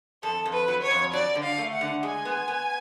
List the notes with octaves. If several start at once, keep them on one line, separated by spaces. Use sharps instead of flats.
F2 A4
F2
B4
F#3
C#5
F2
F#3 D5
D3
F5
A3
F#5
D3
G#3 G#5
B3
B3